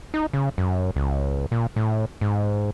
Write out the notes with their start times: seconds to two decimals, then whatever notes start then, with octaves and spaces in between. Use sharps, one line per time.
0.14 D#4
0.33 C#3
0.58 F#2
0.96 C#2
1.52 A#2
1.76 A2
2.21 G#2